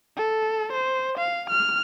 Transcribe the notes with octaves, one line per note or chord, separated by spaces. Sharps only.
A4
C5
F5
F6